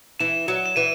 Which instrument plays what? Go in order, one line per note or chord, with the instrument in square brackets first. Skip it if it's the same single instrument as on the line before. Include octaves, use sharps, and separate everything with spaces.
[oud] E3 [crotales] E7
[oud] F#3 [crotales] E7
[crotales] E7
[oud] E3 [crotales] D#7